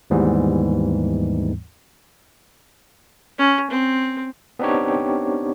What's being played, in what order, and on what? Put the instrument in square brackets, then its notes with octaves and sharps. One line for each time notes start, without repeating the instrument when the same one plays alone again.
[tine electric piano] D#2 G#2 E3 G3 B3
[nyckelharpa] C#4
C4
[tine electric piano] B3 C4 D4 D#4 G4 C#5